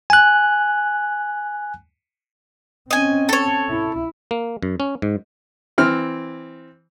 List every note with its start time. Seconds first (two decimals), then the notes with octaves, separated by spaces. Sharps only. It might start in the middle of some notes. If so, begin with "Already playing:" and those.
0.10 G#5 F#6
2.91 C4 C#4 D#5 G#5
3.29 A4 C#5
3.70 E4
4.31 A#3
4.63 F#2
4.80 C#4
5.02 G#2
5.78 E3 C4 F6